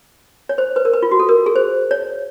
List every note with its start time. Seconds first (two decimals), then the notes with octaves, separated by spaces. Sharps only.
0.49 C#5
0.58 C5
0.76 B4
0.85 A#4
0.93 B4
1.02 F4
1.11 F#4
1.20 A4
1.29 A#4
1.46 G#4
1.56 C5
1.91 C#5